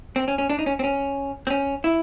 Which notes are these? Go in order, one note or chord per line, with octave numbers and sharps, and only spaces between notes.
C4
C#4
C#4
D4
D#4
C#4
C4
C#4
C4
C#4
E4